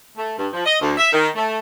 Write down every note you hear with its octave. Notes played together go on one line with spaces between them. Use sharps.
A3
G2
F3
D#5
D2
E5
D#3
A3